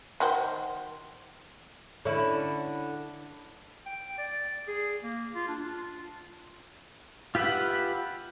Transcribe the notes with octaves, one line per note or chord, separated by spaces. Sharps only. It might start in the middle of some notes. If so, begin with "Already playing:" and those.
D#3 F#4 C5
D3 C#4 E4
G5
D5
G#4
A#3
F4
D4
F4
F4 G4 B4 E5 F#5